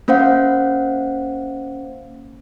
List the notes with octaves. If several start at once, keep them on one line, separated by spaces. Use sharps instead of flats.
A#3 C#4 C5 F5 F#5